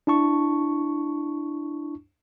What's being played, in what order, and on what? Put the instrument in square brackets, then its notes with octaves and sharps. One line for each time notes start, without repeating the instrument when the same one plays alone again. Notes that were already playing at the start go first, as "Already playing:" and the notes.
[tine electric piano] D4 E4 A5 C#6